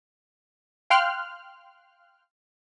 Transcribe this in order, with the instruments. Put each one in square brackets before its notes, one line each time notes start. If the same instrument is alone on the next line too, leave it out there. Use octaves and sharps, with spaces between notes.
[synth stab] F5 G5 C6 F6 F#6